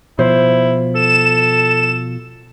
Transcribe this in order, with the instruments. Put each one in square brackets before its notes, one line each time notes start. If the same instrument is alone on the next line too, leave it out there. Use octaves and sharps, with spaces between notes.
[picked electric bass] B2 F3 [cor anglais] E4 [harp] C5
[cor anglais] A4 [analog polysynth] E7